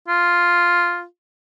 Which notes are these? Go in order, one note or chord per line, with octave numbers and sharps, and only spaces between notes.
F4